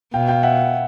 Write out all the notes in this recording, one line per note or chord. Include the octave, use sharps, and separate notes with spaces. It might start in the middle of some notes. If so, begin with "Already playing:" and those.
B2 F5 G5
F5 G5
E5 F#5